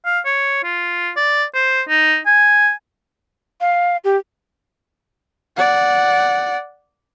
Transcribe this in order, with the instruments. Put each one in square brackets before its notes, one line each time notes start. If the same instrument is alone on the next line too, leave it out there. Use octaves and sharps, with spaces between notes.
[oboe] F5
C#5
F4
D5
C5
D#4
G#5
[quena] F5
G4
[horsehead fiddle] D5 F#5